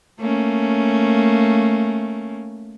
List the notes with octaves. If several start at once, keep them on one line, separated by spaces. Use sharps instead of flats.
A3 A#3 C#4